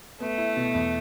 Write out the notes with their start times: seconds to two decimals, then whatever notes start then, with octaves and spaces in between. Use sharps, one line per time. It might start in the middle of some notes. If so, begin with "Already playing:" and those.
0.20 A3 B3
0.38 E4
0.57 B2
0.75 E2